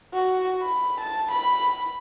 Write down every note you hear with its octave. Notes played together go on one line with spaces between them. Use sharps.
F#4
B5
A5
B5